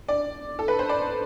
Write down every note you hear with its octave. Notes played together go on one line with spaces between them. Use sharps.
D5
A4
B4
C5
D5